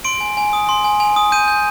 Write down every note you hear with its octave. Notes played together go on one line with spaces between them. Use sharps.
C6 D7
G#5
G#5
D#6
C6
G#5
G#5
D#6
G6 D#7
G6